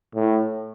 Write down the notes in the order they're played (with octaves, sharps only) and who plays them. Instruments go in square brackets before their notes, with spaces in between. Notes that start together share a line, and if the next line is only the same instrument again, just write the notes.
[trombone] A2